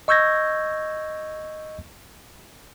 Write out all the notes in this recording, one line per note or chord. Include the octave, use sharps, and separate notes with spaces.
D#5 C#6 E6 G6 G#6 A#6